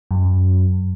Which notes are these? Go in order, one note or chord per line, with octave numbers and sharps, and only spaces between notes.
F#2